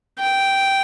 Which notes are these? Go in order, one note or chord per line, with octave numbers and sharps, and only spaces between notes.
G5